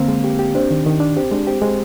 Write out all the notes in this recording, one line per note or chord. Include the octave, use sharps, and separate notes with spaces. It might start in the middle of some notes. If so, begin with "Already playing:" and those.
Already playing: D3 A#3 C4 A#4
G#3
G4
G4
C4 D4 C5
D#3
D#3
D4
C4 G4
G#3 D4
C4 G4
G#3 C4